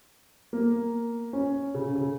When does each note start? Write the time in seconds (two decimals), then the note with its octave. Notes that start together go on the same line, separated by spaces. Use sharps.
0.53 A#3
1.33 C#4
1.74 C#3
1.96 C#3